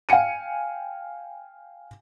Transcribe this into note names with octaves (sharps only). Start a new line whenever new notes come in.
F5 G5 G#5 C#7 D#7